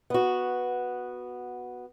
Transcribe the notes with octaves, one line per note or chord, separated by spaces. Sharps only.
B3 F#4